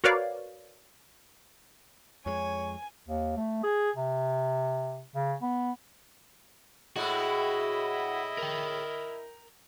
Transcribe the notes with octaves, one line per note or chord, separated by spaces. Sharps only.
F#4 A#4 B4 C#5 D5 F5
F2 G#3 C#5 G#5
D#2
A3
G#4
C3
C#3
B3
A2 G#3 E4 F#4 D#5
A#4 G5